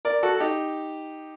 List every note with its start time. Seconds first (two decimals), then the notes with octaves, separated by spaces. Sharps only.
0.05 A#4 D5
0.23 F#4 A4
0.35 A4
0.40 D#4 G4